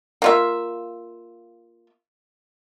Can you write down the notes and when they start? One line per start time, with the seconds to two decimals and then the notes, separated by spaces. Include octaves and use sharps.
0.22 A#3 F4 E5